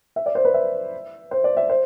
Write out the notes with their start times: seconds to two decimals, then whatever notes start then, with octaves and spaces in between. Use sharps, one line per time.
0.16 E5
0.26 D5
0.35 C5
0.45 B4
0.54 E5
1.31 C5
1.44 D5
1.57 E5
1.69 C5